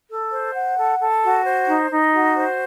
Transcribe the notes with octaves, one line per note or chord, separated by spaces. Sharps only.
A4
C5
F#5
A4
A4
F#4
C5
D#4
D#4
F#4
C5